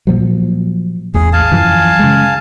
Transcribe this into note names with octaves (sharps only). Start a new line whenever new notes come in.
A#2 F3 F#3
A1 E2 G#4
F5 G#5 A5
F#2 E3 F3
C#3 G#3